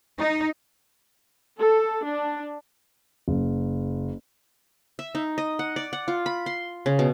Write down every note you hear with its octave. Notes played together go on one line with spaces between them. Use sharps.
D#4
A4
D4
F#1
E5
D#4
D#5
F#5
D5
F#5
F4
B5
C6
C#3
B2